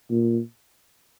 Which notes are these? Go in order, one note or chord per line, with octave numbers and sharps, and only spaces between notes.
A#2